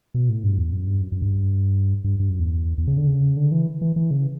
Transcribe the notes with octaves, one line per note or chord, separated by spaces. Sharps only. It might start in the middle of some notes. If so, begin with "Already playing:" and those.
B2
A2
G2
E2
F#2
G2
F#2
F#2
G2
G2
G2
F#2
E2
E2
C#3
D3
C#3
D3
E3
E3
E3
C#3